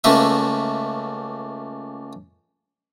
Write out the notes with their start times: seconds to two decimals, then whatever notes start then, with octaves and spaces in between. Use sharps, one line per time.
0.04 C#2 A3 A#3 B4 E5